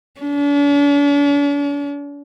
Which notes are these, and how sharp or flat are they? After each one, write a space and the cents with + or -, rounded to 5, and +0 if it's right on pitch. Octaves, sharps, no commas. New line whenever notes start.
D4 -45